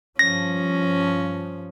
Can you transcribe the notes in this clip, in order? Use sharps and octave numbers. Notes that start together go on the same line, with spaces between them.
G2 F3 C#4 A#6